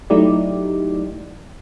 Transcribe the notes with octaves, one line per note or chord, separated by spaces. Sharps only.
F#3 A3 D#4 E4 G4 D5